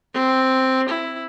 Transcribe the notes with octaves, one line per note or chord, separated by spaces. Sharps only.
C4
E4